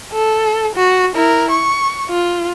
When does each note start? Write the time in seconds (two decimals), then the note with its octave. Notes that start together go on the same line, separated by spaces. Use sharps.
0.13 A4
0.75 F#4
1.16 E4 A#4
1.51 C#6
2.09 F4